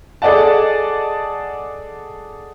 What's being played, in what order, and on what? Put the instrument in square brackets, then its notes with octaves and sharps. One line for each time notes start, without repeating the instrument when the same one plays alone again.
[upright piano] G#4 A4 D5 D#5 F#5 A5